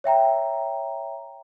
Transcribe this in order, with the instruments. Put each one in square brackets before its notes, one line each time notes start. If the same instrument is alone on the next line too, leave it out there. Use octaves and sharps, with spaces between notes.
[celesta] C#5 E5 G5 A#5